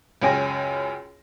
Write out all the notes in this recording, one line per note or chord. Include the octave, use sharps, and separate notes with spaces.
C#2 F#2 C#4 G5 G#5 A#6